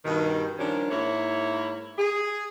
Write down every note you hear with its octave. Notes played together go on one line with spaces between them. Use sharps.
G2 B2 D#3
D#3 F3 G3 C#4 D4
G#2 A#3 E4 C#5
G#4